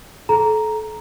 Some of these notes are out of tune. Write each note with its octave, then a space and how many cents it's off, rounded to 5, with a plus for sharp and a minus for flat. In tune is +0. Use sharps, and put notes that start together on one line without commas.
A4 -30 A#5 +0